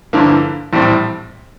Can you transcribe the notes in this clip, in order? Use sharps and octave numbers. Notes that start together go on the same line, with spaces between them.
G2 D3 F3 A#3 E4
A#1 A2 G3 C4